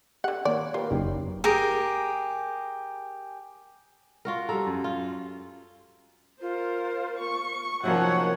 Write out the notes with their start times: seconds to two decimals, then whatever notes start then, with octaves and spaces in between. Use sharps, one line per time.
0.24 D3 G4 F#5
0.45 D#3 A#3 C#5 D5
0.74 F4 G4 A#4 B4
0.91 F#1 D#4 G4
1.44 G4 G#4 A#4
4.25 F4 F#4 A#4
4.49 G3 A4 A#5
4.66 F#2
4.84 F4
6.41 F4 A#4 C5
7.19 C#6
7.83 C3 D#3 F3 F#3 A#3 C#4 C#5 F#5